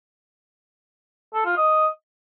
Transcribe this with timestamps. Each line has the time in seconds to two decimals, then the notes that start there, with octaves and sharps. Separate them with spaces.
1.34 A4
1.45 F4
1.57 D#5